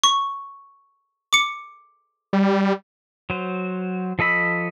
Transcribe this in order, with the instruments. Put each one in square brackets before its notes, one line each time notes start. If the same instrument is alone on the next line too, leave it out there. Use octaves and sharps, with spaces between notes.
[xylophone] C#6
D6 C#7
[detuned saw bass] G3
[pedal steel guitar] F#3 C5
F3 A4 D#5 B5 E6